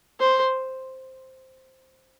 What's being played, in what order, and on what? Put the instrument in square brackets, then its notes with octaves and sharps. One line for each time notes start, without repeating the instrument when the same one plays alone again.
[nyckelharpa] C5